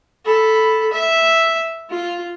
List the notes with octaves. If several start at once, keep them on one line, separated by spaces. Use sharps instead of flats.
A4 B5
E5
F4